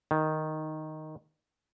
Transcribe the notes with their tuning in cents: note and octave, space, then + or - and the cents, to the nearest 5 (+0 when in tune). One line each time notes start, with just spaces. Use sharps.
D#3 +0